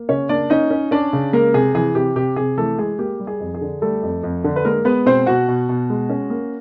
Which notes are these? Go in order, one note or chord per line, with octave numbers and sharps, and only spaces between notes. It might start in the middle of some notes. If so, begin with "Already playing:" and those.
Already playing: A#3
C#3 C#4 C#5
A#3 D4 D5
C#4 D#4 D#5
C#4
C#4 D4 D5
C#3
G#3 A#3 A#4
C3 G#4
E3 G#4
C3 G4
C3 G4
C3 G#4
E3 A3 A4
G#3 G#4
A#3 G4
G3
G#4
F2
G#4
D3
G3 A3 A4
F2
F2
D3
B4
G#3 A#3 A#4
G#3 B3 B4
B2 C4 C5
B2 F#4 F#5
B2
B2
G#3
C#4
A#3